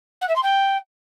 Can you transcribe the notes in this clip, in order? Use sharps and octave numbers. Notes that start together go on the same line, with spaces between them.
F#5
E5
C6
G5